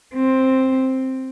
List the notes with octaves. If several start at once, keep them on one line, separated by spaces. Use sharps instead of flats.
C4